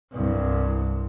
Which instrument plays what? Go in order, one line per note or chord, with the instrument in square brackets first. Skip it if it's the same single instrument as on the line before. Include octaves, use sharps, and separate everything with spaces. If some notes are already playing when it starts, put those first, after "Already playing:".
[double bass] C2 G2